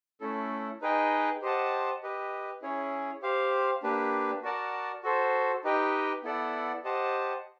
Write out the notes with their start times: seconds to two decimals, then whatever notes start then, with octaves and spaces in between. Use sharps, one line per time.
0.21 A3 C#4 E4 A4
0.81 D#4 G#4 B4 D#5 G5
1.42 G4 C5 D#5 F#5 A5
2.03 G4 B4 D#5
2.62 C#4 E4 G#4 C#5
3.22 G4 C5 F5
3.83 A#3 D4 G4 B4
4.43 F#4 A#4 D5 F#5 A5
5.03 F#4 A4 C5
5.64 D#4 G4 B4 D#5 G5
6.23 B3 E4 A4 D5 F#5
6.84 G4 C5 D#5 F#5 A5